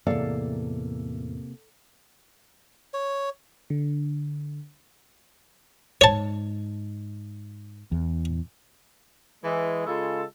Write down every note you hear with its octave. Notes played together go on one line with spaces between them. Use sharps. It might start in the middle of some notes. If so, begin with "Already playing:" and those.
E2 A2 C3 A#3 A4 D5 F5
C#5
D3
G#2 C#5 A5
E2
E3 G#3
C#3 G#3 F4 A4